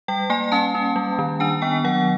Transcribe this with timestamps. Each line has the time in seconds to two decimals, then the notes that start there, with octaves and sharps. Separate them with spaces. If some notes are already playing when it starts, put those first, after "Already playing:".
0.08 G3 G5
0.30 A#3 G#5
0.44 G#5
0.52 C#4 A5
0.75 C#4
0.96 G3
1.19 D#3
1.40 D4 G#5
1.62 B3 G5
1.84 F#3 F#5